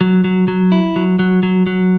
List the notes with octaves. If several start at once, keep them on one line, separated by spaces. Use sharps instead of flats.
F#3
F#3
F#3
E4
F#3
F#3
F#3
F#3